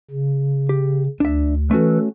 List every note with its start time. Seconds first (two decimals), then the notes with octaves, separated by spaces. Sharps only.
0.11 C#3
0.69 G4
1.20 D2 D4 E5
1.71 E3 A3 C#4 F#4 A4 B4